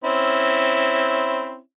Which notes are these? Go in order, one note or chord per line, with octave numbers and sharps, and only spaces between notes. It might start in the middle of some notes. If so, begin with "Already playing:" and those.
C4 C#4 E4